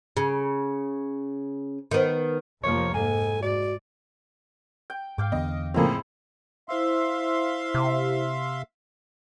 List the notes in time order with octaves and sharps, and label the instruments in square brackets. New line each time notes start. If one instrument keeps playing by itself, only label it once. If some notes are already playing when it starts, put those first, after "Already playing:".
[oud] C#3
D#3 B3
[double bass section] F1 F3 A#3 [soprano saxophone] C#5
[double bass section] G#2 [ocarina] A4 [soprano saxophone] G#5
[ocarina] F#4 [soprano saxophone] D5
[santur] G5
[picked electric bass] G#2 [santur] F5 G5 D6
[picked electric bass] E2 D3 B3 [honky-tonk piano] D#5
[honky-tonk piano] F2 A2 [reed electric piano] C#3 F3 A#3 [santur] C4 E4 G#4
[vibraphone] E4 C5 E6 [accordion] E5 F5 C6
[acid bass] C3